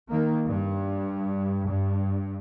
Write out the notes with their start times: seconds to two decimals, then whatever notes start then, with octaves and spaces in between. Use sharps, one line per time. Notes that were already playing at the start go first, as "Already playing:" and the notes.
0.10 D#3 A#3
0.46 G2
1.67 G2